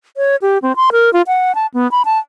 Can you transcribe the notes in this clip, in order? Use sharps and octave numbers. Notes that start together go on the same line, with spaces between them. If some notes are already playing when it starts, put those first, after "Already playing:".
C#5
G4
C4
C6
A#4
F4
F#5
A5
B3
B5
A5